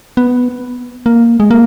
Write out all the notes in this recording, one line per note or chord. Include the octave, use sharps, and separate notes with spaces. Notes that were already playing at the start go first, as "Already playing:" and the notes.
B3
A#3
G#3
A#3